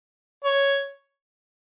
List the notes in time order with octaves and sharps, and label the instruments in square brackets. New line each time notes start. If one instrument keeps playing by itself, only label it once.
[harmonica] C#5